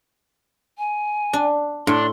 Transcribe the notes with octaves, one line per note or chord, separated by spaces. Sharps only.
G#5
D4
A2 D4 C6